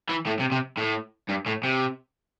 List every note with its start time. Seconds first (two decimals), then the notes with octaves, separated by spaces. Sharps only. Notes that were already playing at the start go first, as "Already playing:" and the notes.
0.09 E3
0.26 A2
0.39 C3
0.52 C3
0.78 A2
1.29 G2
1.46 A2
1.63 C3